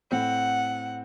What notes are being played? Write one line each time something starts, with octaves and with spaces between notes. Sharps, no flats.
A2 C4 F#5